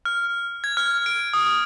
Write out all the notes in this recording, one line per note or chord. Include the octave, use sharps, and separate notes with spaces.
F6
G#6
F6
D7
D#6